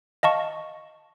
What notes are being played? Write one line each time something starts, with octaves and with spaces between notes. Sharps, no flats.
D#5 F5 A5 C#6